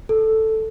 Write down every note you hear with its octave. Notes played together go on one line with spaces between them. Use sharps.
A4